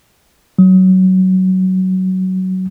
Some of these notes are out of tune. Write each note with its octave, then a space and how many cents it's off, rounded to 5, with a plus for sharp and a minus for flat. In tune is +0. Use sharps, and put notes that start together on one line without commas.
F#3 +15